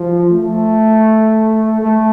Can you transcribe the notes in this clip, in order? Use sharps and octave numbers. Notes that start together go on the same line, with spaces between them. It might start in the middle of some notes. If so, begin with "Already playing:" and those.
Already playing: F3
A3
A3